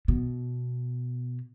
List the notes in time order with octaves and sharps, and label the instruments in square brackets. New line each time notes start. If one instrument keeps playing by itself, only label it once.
[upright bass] B2